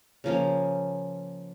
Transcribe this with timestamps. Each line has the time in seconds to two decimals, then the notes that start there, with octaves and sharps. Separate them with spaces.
0.24 C#3 F3 A#3 C#4